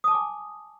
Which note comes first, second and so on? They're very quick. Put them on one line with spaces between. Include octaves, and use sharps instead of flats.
D#6 A5 D6 G#5